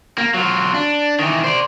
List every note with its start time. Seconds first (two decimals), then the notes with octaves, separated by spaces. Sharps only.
0.18 A#3
0.34 F#3 F4
0.74 D4
1.19 D#3 E3
1.44 C5 D5